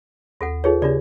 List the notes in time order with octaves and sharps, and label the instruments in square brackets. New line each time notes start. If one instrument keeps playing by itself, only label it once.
[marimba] D#2 [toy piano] F4 A4 F#5
[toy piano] D#4 G#4 C#5 [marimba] F4 A4 B4
[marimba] C#3 G4 [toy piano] D4 F4 D5